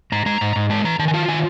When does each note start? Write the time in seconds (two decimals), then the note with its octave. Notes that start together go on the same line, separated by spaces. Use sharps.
0.12 G#2 A#5
0.26 G#3 A#5
0.41 G#2
0.56 G#2
0.70 G#3 A5
0.84 E3 A#5
0.99 D#3 A5
1.08 G#5
1.14 F4 A5
1.28 D#3 G#5